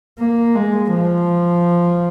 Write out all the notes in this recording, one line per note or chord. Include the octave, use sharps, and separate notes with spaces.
A#3
G#3
F3